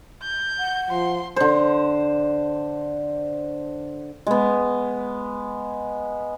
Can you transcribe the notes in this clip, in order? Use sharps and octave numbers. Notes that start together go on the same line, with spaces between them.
G6
F#5
F3 C6
D3 C5
G#3 B3